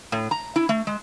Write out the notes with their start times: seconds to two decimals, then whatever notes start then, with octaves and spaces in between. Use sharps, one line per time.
0.12 A2
0.31 A#5
0.56 E4
0.69 A3
0.87 G#3